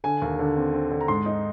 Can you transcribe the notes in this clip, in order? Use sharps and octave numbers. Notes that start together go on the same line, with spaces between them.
D3 G#5
D#2
D3
C4
C4
D3
A#5
G#2 C6
D#4